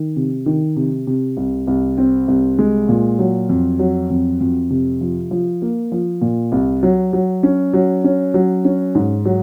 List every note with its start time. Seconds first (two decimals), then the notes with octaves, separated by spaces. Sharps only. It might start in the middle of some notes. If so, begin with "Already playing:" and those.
Already playing: D#3
0.16 C3
0.46 D#3
0.76 C3
1.07 C3
1.37 C2
1.67 C2
1.98 C4
2.28 C2
2.59 G#3
2.89 A#2
3.19 F#3
3.49 F2
3.79 F#3
4.10 F2
4.40 F2
4.70 C3
5.01 F3
5.31 F3
5.62 A#3
5.92 F3
6.22 A#2
6.52 C2
6.83 F#3
7.13 F#3
7.43 C#4
7.73 F#3
8.04 C#4
8.34 F#3
8.65 C#4
8.95 G#2
9.25 F#3